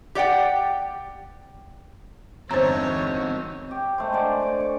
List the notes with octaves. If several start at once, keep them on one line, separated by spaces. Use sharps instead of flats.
G4 D5 F#5 G5
E2 G2 D3 C4 D#4 C5 C#5 A#5
G4 C#5
G#3 A3 C5
D3 C5 D5
G#5 D6
C#6